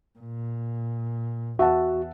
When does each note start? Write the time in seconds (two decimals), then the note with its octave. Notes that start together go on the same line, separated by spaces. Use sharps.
0.19 A#2
1.59 E2 F#4 E5 F#5 A5